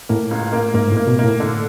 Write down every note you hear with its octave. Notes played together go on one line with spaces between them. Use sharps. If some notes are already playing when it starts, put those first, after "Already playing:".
A2 A#3
C#2
A#3
G#2 A#3
A2
A#3
B2
A#3
A2
D3